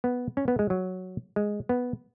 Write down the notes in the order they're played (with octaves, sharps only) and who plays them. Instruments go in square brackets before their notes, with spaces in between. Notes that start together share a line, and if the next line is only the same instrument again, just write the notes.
[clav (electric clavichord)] B3
C#4
B3
G#3
F#3
G#3
B3